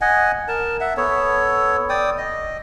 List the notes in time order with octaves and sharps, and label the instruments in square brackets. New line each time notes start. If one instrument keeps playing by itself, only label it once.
[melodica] D#5 F#5 G#5
A#4 A5
E5 F#5
B3 A4 C#5
D5 G5 D#6
D#5